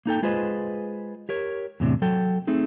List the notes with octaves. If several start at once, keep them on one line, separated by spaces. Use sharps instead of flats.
A#3 D#4 A4 G5
G#3 F4 G#4 B4 C5 D#5
G4 A#4 C#5
E2 A2 C3 D4
F#3 A4 G5
A3 C4 D#4 G#4